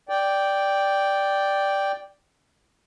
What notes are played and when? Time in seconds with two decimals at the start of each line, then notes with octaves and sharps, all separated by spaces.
0.09 D5 G5